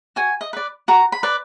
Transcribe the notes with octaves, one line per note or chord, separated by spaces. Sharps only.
F#4 G#5
D#5
B4 D5
F#4 A#5
B5
B4 D5